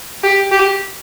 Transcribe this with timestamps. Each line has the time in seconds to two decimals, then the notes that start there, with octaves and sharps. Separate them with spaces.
0.23 G4
0.52 G4